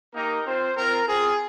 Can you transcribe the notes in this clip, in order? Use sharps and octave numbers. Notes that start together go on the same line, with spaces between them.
A#3 D#4 G4 A#4
C4 F4 C5
C4 F4 A#4
C4 F4 G#4